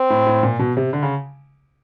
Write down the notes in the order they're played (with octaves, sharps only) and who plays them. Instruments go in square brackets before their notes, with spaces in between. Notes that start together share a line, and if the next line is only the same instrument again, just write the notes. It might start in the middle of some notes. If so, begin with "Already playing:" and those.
Already playing: [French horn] C4
[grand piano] A2
A2
A#2
B2
C3
D3
C#3